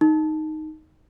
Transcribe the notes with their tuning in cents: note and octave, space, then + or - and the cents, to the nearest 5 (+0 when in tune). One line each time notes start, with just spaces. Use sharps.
D#4 +0